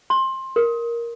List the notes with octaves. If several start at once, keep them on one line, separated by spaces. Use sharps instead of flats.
C6
A#4